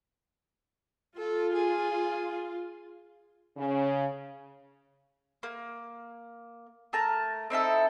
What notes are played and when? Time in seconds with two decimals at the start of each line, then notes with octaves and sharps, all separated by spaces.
1.18 F4 A4
1.53 G#4
3.56 C#3
5.43 A#3
6.93 A3 A#4 A5 A#5
7.50 C4 D#4 E4 A4